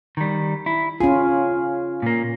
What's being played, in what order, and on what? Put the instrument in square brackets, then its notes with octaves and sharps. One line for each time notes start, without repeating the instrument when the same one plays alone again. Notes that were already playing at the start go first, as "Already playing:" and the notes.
[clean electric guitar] D#3 G3
E4
[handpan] C#4 F4 [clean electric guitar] G#4
[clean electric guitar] A#2 A#3